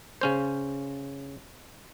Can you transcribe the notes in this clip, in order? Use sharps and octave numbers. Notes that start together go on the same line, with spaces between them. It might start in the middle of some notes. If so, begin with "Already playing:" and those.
C#3 C#4 C5